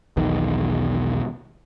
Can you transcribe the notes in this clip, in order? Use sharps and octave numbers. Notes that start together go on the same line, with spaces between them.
B1 E2 B2 D#3